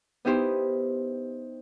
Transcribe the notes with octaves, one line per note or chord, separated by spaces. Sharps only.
B3 D#4 E4 G4 C5